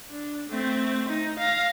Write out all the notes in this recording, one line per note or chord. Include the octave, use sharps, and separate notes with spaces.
D4
A3 C4
D#4
F5 A#6